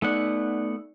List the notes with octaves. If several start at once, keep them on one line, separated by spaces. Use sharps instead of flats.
A3 B3 D#4 D5 F#5